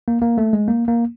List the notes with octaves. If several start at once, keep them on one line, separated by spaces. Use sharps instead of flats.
A#3
A#3
A3
G#3
A#3
A#3